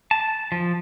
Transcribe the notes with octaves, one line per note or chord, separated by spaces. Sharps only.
A5
F3